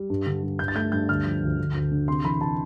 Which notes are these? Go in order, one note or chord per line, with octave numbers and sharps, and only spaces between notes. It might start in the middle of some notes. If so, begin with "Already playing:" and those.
Already playing: G3
G2
D3
G2
G2 G6
A6
A3 G6
G2 G6
D2 F6
F3
D2
D2
D2
D3
C3 C6
E3 B5
C3 A5